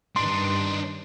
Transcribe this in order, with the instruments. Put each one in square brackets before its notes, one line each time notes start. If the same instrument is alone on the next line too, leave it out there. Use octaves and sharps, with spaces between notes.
[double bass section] G2 D#3 [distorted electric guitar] D4 D#4 [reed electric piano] C6